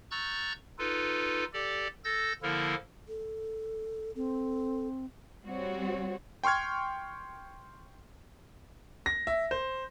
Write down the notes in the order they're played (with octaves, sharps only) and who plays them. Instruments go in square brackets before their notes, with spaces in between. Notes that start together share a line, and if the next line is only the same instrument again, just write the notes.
[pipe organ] A#5 C#6 E6 F#6 G6 A6
D#4 F4 A4 B4
G4 A4 D5
A4 E6 G6 A6 A#6
D3 F3 A#3 E4 A4 A#4
[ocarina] A4
[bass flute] C4 [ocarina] A4
[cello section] G3 C4 F#4 C#5
[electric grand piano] G5 C6 C#6 F6 G#6
[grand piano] A#6
E5
C5